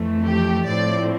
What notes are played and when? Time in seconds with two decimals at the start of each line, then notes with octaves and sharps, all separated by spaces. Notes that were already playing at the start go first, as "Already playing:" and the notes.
Already playing: F2 E3 A3
0.26 G4
0.67 A2 F3 C4 D5